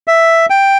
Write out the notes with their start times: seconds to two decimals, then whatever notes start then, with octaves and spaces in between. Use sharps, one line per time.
0.08 E5
0.50 G5